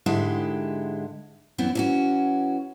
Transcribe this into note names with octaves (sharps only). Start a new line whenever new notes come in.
G#2 D3 G#3 E4 G4
F#2 E3 B3 C4
E3 C#4 F#4